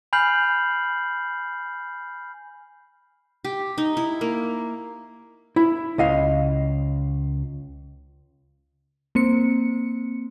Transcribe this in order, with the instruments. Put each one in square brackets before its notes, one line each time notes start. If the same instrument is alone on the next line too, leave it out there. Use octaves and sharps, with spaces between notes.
[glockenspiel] G#5 B5 F6 G6 C7 F#7
[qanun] G4
D#4
E4
A#3
[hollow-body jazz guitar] E4
C#2 D#5 F5
[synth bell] A#3 C4 C#7